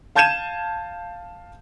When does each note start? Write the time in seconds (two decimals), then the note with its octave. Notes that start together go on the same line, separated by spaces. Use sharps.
0.16 F5 A5 G6 G#6 D#7 E7